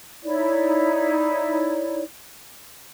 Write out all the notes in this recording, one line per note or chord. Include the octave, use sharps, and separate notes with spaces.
D#4 E4 C#5 D5